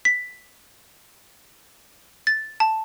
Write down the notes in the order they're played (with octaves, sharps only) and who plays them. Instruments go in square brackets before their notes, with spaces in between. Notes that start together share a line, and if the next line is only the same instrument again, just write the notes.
[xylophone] B6
A6
A5